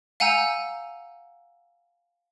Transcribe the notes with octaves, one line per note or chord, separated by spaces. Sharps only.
F5 F#5 G#5 A#5 E6 G6